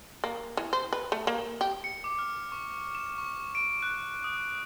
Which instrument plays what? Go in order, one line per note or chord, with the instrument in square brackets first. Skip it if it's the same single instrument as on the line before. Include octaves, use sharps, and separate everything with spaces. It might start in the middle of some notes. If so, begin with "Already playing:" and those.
[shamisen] A#3
E3
C5
B4
A3
A#3
G4
[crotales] C#7
D6
F6
C#6
E7
C#6
D7
F#6
D#6